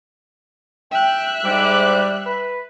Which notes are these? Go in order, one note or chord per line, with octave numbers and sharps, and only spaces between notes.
E5 G5 F#6
G#2 G3 D6
B4